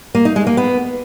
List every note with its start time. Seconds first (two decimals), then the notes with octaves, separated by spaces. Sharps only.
0.15 A#3
0.25 D#4
0.36 G#3
0.47 A#3
0.57 B3